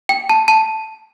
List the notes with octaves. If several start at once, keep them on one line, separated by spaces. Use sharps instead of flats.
G5
A5
A5